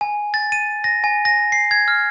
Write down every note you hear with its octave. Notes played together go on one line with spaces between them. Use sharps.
G#5
A6
D#7
A#6
G#5
A#6
C7
G#6
F6